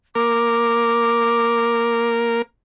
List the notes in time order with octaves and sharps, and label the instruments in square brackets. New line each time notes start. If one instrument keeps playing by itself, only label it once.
[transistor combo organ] A#3 A#4 [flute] D6